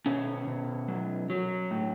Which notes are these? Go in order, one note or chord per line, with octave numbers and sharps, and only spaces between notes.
B2 C#4
B2
F#3
F#3
A2